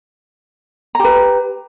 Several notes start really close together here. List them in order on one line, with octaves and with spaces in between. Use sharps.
A#5 G4 B4